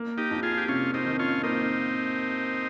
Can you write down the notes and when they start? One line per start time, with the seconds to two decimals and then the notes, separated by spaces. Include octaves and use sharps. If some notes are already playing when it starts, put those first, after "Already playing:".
Already playing: A#3
0.18 D#4 G4
0.31 F2
0.43 F4 G#4
0.58 G4
0.68 C3 C#4 F4
0.94 C4 D#4
1.06 D#3
1.19 C#4 F4
1.43 A#3 C4 D#4